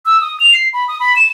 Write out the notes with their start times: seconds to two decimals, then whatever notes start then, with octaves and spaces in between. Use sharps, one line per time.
0.06 E6
0.21 D#6
0.40 F7
0.54 C7
0.73 B5
0.88 D#6
1.00 B5
1.16 E7